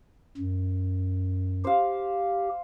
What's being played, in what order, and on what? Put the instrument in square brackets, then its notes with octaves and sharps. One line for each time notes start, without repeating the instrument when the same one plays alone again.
[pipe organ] F#2
[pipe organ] G4 [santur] C5 F5